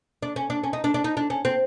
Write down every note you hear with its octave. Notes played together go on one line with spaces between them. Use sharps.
D4
C#4
D4
C#4
D#4
D4
D4
D#4
D4
C#4
C4